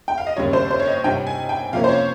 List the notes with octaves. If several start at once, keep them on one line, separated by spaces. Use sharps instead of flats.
G5
F5
D#5
D#2 C#3 G3 C#5
C5
C5
C#5
D#5
C3 G3 C4 D#4 G5
G#5
G5
C3 F3 A#3 C#4 F5
C5
C#5